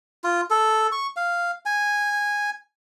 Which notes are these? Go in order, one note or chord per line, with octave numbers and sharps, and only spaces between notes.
F4
A4
C#6
F5
G#5